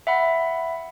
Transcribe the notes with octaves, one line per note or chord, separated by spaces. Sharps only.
E5 F#5 B5